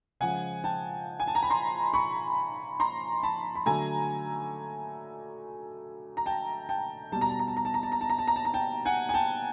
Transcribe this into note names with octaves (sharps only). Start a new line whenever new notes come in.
C#3 F3 G#3 F#5 G#5
G5 A5
G#5
A5
A#5
B5
A#5 C6
B5 C#6
A#5 C6
A5 B5
B5
D3 F#3 A3 G#5 A#5
A#5
G5 A5
G5 A5
B2 G3 A5
A#5
A5
A#5
A5
A#5
A5
A#5
A5
A#5
A5
A#5
A5
A#5
A5
A#5
G5 A5
F#5 G#5
G#5
G5 A5